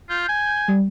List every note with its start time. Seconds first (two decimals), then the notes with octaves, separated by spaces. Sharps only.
0.09 F4 G6
0.29 G#5
0.68 G3